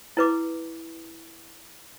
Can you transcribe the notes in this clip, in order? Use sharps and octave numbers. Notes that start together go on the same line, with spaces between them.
E4 B4 D6